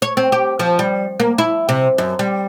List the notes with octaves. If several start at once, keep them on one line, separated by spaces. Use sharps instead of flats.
C#5
C4
G4
F3
G3
A#3
E4
C3
F#2
G3